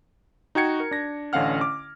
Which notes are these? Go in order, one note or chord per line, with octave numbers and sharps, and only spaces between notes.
D#4 F#4 G5 G#6 C#7
A#4
D4 A#6
A1 D3 C#4 F5 F#5 F6
D6